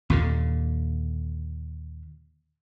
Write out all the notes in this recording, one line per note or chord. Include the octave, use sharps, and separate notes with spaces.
D#2 A#2 D3